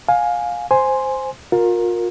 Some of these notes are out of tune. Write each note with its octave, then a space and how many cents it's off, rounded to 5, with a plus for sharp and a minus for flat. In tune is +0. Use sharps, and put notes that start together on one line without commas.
F5 +20 G#5 +0
C5 +0 G#5 +0 C6 +0
F4 +40 A#4 +0